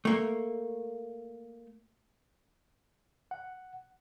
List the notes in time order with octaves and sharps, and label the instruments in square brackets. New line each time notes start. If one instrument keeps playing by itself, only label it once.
[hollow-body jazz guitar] A3 A#3
[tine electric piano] F#5